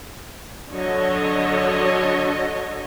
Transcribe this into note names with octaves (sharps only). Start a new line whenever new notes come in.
D3 F#3 A4 C#5 D#5